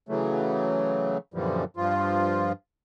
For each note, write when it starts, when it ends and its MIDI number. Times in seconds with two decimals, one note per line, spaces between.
0.09 1.18 49
0.09 1.18 52
0.09 1.18 54
0.09 1.18 57
1.34 1.64 42
1.34 1.64 46
1.34 1.64 50
1.34 1.64 52
1.34 1.64 53
1.34 1.64 55
1.77 2.52 43
1.77 2.52 53
1.77 2.52 65